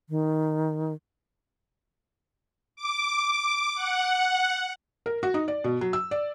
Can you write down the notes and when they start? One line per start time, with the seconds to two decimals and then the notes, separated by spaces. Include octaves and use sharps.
0.09 D#3
2.76 D6
3.75 F#5
5.06 A#4
5.23 F#4
5.34 D#4
5.48 D5
5.64 B2
5.81 F#3
5.93 E6
6.11 D5